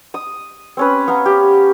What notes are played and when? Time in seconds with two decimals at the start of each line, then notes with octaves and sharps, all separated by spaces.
0.14 D#6
0.77 C4 C#4 B4
1.08 B3 F5 A#5
1.26 G4